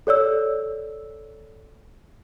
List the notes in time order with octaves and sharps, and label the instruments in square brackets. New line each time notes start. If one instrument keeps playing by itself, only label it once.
[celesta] A4 C#5 D5 E6